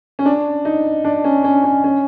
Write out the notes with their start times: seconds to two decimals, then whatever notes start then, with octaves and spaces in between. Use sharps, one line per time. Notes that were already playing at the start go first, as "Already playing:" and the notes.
0.19 C#4
0.25 D4
0.65 D#4
1.04 D4
1.24 C#4
1.44 C#4
1.64 C#4
1.84 C#4